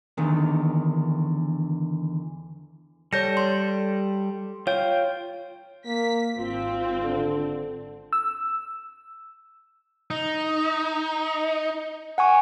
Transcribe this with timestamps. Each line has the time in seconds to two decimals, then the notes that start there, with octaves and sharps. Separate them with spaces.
0.18 E2 D3 D#3
3.13 G3 A4 C#5 G6 A#6
3.37 C6
4.67 F4 C#5 G5
5.86 A#3 B6
6.36 G#1 C4 F4
7.03 D3
8.13 E6
10.10 D#4
12.18 F#5 G#5 C#6